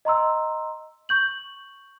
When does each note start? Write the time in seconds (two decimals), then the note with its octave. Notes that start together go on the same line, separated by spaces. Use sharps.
0.05 D#5 A#5 C6 E6
1.09 C#6 G6 F#7